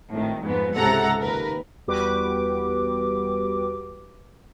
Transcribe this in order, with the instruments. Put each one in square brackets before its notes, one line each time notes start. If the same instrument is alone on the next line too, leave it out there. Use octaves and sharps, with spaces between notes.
[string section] G#1 A2 D#3
F2 G#2 B3
C#2 G#2 C3 A4 F#5 A#5
D#2 A#4 B4
[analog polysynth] E2 G3 F#4 G4 B4 D6